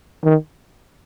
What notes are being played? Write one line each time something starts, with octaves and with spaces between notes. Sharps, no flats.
D#3